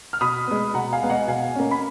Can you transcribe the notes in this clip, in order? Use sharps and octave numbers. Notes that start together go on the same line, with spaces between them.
F6
B2 B5 D#6
G#3 B3
B2 F#5 A#5
F5 G#5
G#3 B3
D#5 F#5
B2 F5 G#5
A#3 C#4
B5